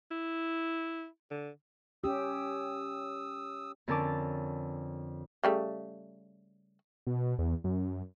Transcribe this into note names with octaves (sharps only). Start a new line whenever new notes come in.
E4
D3
C#4 G4 D#6 E6
F2 D3 C#4 A#4 A5 D6
C#3 G3 A3
B2
E2
F#2